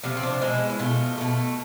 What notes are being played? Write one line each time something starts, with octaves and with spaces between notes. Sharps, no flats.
C3 F3 A3 B3
C4
D4
B2 G#3 E4
E4
B2 A3 F4
B2 A3